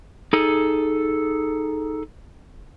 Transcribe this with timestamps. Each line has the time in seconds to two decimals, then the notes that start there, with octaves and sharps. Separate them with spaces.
0.33 D#4 G#4 A4